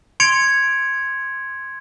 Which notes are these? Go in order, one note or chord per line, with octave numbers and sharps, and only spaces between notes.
C6 G#6 C#7 D7 F7